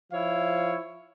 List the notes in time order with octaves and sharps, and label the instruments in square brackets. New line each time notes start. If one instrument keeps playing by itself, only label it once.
[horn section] F3 E4 C#5 F5